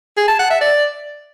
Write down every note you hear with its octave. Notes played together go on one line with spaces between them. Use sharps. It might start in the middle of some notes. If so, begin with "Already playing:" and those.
G#4
A5
F#5
E5
D5